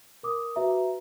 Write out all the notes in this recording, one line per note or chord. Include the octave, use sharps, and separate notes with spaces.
A#4 D6 D#6
F#4 B4 E5 A#5